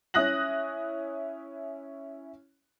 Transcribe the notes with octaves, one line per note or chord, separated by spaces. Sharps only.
C#4 E4 D#6 F#6 A#6 F#7